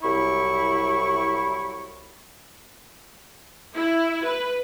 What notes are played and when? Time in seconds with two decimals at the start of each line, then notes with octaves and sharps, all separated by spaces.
0.02 C2 F#3 E4 B5 C#6
3.74 E4
4.23 B4